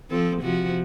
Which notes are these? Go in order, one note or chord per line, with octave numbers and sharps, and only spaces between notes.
F3 C4 A4
C3 F3 F#4